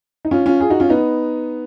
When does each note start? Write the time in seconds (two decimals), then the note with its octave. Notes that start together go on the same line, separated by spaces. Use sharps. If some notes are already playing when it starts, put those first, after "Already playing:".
0.25 D#4
0.31 C#4 F4
0.46 C#4 F4
0.60 F4 G#4
0.70 D#4 F#4
0.80 C#4 F4
0.90 B3 D#4